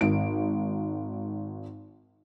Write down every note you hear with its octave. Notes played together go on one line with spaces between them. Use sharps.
G#1 D7